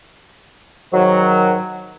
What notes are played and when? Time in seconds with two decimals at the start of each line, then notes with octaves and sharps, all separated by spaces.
0.92 G#2 D#3 F#3